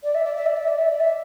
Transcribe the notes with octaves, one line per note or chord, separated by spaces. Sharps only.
D5
E5
D5
E5
D5
E5
D5
E5
D5
E5